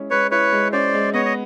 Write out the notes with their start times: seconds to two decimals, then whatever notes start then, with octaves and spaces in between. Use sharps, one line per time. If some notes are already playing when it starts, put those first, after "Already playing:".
Already playing: G#3 C#4 E4
0.11 G#3 B4 C#5
0.31 E4 B4 C#5
0.52 G#3
0.72 C#4 C5 D5
0.94 G#3
1.13 B3 C#5 D#5
1.25 D#5